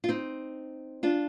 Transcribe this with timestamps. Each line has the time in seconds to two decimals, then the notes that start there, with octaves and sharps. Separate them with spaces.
0.04 F4
0.09 C4 D#4
1.03 D4 F4